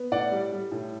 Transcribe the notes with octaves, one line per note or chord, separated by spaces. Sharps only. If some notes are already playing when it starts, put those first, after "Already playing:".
Already playing: B3
A2 D5 F#5
G3
G3
A2